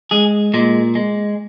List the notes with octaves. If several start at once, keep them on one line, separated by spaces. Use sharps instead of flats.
G#3 G#4
A#2 G#3
G#3